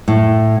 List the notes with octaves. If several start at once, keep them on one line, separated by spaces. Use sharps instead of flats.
A2